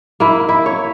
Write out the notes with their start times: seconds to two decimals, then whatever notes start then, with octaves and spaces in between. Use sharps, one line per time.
0.20 A#3 E4
0.49 E4
0.66 C#5